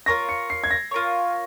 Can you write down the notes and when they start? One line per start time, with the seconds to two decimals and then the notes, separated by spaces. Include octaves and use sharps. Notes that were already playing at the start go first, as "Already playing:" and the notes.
0.06 F4 A#4 C#5 A#6
0.29 C#7
0.50 C7
0.64 G#6
0.71 A#6
0.91 F4 A#4 C#5